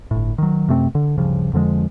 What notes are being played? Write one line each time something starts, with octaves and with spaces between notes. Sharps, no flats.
G1 A2
D#3 F#3
F#2 C3 A3 C4
D3
D1 G2 C#3 F3
F2 D3 F3 G#3